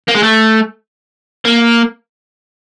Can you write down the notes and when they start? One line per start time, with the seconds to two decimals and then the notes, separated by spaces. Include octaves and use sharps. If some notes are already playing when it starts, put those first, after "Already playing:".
0.08 A#3
0.15 G#3
0.23 A3
1.45 A#3